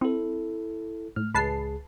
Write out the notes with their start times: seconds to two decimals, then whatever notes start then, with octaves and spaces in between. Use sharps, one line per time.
0.01 C4 E4 A4
1.16 A2 F6
1.34 C#2 G#4 B4 A5 C7